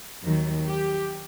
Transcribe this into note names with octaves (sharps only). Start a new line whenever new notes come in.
D#2 D#3 F#3
G4